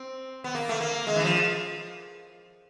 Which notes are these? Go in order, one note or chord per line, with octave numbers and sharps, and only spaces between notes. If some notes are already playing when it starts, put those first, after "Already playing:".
Already playing: C4
B3
A#3
A3
A#3
G#3
E3
F3